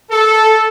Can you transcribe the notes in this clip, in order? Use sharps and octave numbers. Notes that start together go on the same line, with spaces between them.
A4